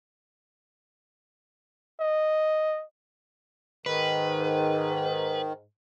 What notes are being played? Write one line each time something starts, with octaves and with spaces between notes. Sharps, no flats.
D#5
G#2 D#3 B4